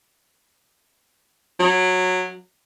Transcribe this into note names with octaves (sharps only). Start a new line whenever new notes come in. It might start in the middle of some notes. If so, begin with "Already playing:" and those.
F#3